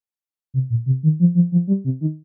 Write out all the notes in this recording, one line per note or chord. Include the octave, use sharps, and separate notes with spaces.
C3
A#2
C3
D#3
F3
F3
F3
G3
C3
D#3